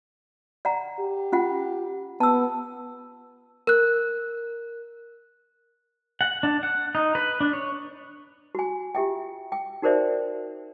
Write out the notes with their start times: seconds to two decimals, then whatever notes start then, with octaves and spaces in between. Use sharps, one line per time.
0.65 D5 F#5 A#5
1.00 G4
1.32 C#4 F4 F#5
2.20 B3 A5 E6
3.67 A#4 F#6
6.21 F#5
6.43 D4
6.63 F#5
6.95 D#4
7.15 B4
7.40 D4
7.53 C#5
8.55 F#4 G#5
8.95 F4 G4 E5 G5
9.52 G5
9.82 D#4 F#4 A#4 C5 D5 E5